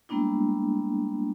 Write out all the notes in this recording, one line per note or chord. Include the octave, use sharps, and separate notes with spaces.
G3 G#3 A#3 B3 D4 E4